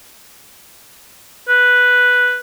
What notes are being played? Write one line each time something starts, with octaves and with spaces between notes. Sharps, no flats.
B4